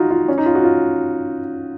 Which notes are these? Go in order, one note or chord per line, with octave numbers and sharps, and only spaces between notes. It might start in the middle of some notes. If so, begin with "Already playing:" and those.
Already playing: D#4 F4 F#4
F4
C#4
D#4
F4
F#4
F4